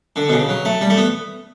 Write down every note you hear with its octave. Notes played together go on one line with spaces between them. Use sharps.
D3
B2
C#3
F#3
A3
G3
A3
B3